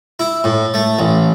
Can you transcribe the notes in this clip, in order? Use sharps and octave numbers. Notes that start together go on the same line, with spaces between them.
E4
A2
A3
A1